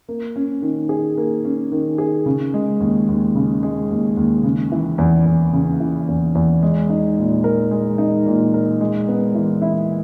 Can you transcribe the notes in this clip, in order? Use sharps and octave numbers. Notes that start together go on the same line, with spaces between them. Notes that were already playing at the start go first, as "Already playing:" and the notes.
A#3
C#4
D#3
G#4
A#3
C#4
D#3
G#4
C#3
G#3
D#2
D#2
C#3
G#3
D#2
D#2
C#3
E3
E2
E2
C#3
E3
E2
E2
G#3
D#4
A#2
A#4
G#3
D#4
A#2
A#4
G#3
B3
E3
E4